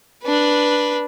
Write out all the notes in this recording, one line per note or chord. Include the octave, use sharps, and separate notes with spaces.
D4 B4